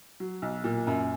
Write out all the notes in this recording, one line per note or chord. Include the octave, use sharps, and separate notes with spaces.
F#3
B1
A#2
F#2